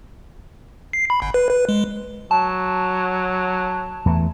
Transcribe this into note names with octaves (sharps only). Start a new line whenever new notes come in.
C7
B5
G1
B4
B4
G#3
F#3 A5
E2 E3 A3